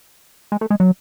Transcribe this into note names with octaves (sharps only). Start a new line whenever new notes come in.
G#3
A3
G#3
F#3